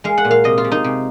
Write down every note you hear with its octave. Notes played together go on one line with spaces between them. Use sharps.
G#3 F5
F#5
A#2
F5
C3 D#5
F4
C3
D#4
C3